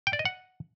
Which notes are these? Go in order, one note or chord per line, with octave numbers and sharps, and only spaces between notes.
G5
D5
D#5
F#5